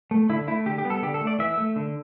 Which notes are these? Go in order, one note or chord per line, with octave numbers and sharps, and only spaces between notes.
A3
D3 E4
A3 E4
D3 G4
G4
G3 B3
A4
D3 G4
A4
A3
D5
E3 E5
A3
D3